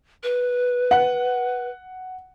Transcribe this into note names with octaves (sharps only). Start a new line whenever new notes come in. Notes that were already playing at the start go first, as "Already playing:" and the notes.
B4
F#5